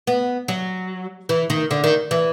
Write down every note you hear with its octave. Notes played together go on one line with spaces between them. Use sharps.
B3
F#3
E3
D#3
D3
D#3
E3